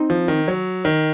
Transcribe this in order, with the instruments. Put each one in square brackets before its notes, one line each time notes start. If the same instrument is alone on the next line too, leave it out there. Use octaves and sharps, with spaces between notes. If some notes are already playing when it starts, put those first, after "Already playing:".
Already playing: [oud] C4 D#4
[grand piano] F3
D#3
F#3
D#3